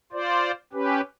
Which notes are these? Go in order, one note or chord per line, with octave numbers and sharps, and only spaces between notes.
F4 C5 D5
C#4 G4 B4